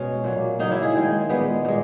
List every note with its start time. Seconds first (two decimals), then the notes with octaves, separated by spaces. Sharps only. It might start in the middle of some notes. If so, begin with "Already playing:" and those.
Already playing: B2 G#3 C#4
0.24 A#2 F#3 A#3
0.59 C#3 F#3 A#3 D#4
0.71 E4
0.82 G#4
0.95 D#3 G#3
1.29 A#2 G#3 B3
1.65 A#2 G#3